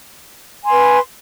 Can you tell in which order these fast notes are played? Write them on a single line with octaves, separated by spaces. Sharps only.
G#5 C6 B4